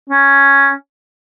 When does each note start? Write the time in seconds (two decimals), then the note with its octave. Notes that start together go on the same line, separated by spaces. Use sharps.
0.09 C#4